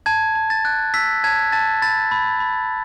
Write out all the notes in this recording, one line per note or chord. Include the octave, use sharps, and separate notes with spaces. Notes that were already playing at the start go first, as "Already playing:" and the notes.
A5 G#6
A5
A6
F#6
E6 B6
A5 G#6
A5 A6
B5 A6
B5
B5